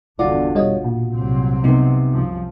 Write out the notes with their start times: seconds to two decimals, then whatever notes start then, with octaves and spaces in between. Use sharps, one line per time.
0.19 G1 E2 D3 F4 F#4 D5
0.55 B2 G3 C#5 D#5
0.84 A#2
1.14 C2 F#3 C4
1.64 C3 B3 D#4
2.11 C2 F#2 F3